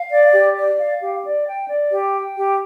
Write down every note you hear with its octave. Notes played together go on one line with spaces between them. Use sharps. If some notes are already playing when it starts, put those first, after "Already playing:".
Already playing: F5
D5
G4
D5
F5
G4
D5
G5
D5
G4
G5
G4